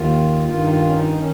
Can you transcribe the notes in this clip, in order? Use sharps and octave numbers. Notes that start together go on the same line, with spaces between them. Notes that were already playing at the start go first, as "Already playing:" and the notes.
Already playing: D#2 D#3 F4
G2 D#3 F4
D#4
F4
C#4
D#4
D#3 C#4